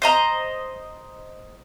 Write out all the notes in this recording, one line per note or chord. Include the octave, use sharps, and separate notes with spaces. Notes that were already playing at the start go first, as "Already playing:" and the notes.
C5 D#5 A#5